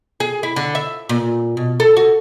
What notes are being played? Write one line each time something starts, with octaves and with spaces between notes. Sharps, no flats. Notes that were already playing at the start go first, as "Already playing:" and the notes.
G#4
E4
D3
E5
A#2
B2
A4
F#4